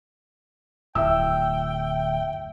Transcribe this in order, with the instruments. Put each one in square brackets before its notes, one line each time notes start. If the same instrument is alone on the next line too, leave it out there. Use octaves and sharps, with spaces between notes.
[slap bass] D1 [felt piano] E5 E6 [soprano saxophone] G5